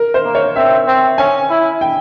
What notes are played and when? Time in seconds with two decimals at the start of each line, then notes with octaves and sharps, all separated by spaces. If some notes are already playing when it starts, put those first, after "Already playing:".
Already playing: A#4
0.14 C5
0.24 A#3
0.35 C#5
0.56 C4 E5
0.87 C4
1.18 C#4 G#5
1.50 E4
1.81 G5